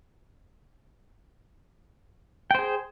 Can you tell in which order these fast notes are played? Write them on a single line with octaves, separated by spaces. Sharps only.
G5 C5 G#4